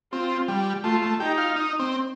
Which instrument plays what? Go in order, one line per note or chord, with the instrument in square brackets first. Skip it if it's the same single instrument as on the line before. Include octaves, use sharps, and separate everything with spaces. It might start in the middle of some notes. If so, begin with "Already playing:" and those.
[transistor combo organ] C4 [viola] F4
[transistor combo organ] G3
[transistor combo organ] A3 [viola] F4
[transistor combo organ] A3
[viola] D#4 [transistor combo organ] G4
[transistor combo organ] F4
D#4
C4